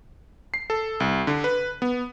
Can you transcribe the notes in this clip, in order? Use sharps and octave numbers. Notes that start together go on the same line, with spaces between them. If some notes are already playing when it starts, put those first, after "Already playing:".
C7
A4
C2
D3
B4
B3